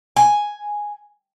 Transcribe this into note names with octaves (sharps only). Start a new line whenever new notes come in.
G#5